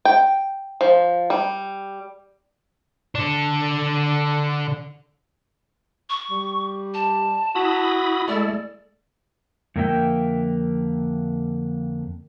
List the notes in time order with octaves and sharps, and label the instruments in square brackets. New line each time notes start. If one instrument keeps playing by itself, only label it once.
[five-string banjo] G5
F3
G3
[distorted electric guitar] D3 D4
[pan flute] C#6
[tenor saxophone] G3
[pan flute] A5
[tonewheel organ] E4 B5 D#6 [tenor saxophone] F#4
[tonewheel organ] G#3 A3 A4 [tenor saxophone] E4 [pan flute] D5
[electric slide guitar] F2 D3 A#3 A#4 E5 G5